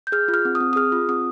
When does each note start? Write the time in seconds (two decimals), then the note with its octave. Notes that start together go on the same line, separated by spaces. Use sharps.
0.07 G6
0.12 G#4 F6
0.28 F4
0.34 F6
0.45 C4
0.55 D#6
0.60 C4
0.73 D#6
0.76 G#4 F6
0.92 F4
1.09 C4 D#6